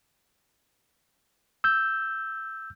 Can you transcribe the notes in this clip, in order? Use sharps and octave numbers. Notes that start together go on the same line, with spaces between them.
E6 G6